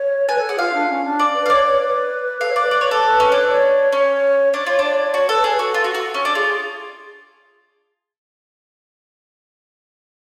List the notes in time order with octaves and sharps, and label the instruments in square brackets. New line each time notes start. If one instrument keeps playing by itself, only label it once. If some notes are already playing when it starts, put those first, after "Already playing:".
Already playing: [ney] C#5
[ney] B4 [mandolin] G#5
[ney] A4
[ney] G#4 [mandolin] F#5
[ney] F4 [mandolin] F5
[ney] D4
C#4
D4
[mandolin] D5
[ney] B4
[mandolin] F5
[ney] C#5 [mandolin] D5
[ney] C#5
B4
[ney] A4 [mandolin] F5
[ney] C#5
[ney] B4 [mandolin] D5
[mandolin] D5
C#5
A4
C#4
[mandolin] D4 [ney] C#5
[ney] C#5
[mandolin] C#4 [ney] C#5
[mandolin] D4 [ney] C#5
[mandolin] F4 [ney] C#5
[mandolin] D4 [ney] D5
[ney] C#5
[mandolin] F#4 [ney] C#5
[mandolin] A4 [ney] B4
[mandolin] G#4 [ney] B4
[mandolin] F#4 [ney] A4
[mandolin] F4
F#4
F#4
C#4
D4
[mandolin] F4 [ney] G#4
[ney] G#4